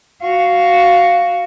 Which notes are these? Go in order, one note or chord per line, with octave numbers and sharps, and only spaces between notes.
F#4 F5